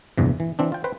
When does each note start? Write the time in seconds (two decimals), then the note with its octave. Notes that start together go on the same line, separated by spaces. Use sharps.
0.18 A#1 E2 G2 C3
0.40 E3
0.59 E3 C4 D4
0.72 F4 G5
0.84 B4 C5 G5